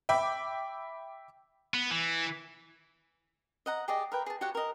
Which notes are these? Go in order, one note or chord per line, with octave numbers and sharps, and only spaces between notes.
E5 G5 B5 D6
B3
E3
D#5 F#5 A#5
G4 G#4 D5 D#5
A#4 B4 G5
G#4 A5
F#4 G4 C#5 F#5
A#4 D#5